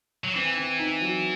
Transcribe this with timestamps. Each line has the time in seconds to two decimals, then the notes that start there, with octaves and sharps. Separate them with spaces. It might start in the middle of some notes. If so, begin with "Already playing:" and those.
0.24 F#3
0.35 E3 C4
0.57 C4
0.79 D#4
1.01 F#3